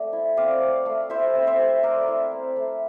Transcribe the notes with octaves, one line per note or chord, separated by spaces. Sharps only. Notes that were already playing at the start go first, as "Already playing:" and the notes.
Already playing: A3 C4 D5 G5
E4
C4 D5 F5
A3
A3
E4 C5 E5
C4
C5 E5
A3
A3 A#4 D5
E4
C4
A3